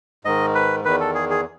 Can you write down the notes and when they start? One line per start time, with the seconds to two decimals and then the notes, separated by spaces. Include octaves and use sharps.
0.25 G#2 D#3 D#5
0.55 B4
0.85 E2 D#3 B4
1.00 A4
1.15 G#4
1.30 G#4